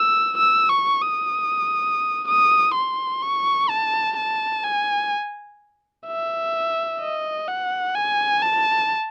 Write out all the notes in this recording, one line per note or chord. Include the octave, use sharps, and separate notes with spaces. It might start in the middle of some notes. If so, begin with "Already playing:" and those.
Already playing: E6
E6
C#6
D#6
D#6
C6
C#6
A5
A5
G#5
E5
D#5
F#5
G#5
A5